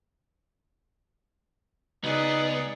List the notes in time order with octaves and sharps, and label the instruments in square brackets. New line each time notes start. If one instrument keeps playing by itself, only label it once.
[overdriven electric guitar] C#2 [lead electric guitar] B3 [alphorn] D#4 [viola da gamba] G#4 D5